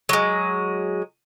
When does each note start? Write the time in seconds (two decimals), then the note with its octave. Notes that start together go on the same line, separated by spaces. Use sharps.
0.09 F#3 G#3